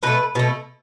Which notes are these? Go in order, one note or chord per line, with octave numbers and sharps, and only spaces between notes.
B2 A3 B4
B2 A3